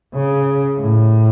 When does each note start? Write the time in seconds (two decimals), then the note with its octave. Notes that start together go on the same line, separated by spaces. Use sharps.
0.14 C#3
0.77 A2